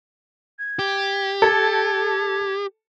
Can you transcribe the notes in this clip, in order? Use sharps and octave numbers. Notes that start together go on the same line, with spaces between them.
G#6
G4
A4 G#6
G#6